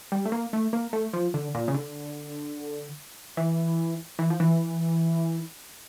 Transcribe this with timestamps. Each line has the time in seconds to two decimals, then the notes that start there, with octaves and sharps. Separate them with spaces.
0.12 G3
0.25 A3
0.32 A#3
0.53 A3
0.73 A#3
0.93 A3
1.13 F3
1.34 D3
1.55 A#2
1.68 C#3
1.75 D3
3.37 E3
4.19 E3
4.30 F3
4.40 E3